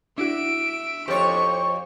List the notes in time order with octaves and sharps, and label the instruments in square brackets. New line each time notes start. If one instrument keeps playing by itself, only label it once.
[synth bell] D4 E4 F#4 [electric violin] E5 D7
[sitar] F2 C#5 [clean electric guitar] G4 A4 C5 [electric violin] C#6